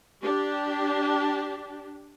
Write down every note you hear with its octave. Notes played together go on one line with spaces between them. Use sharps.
D4 G4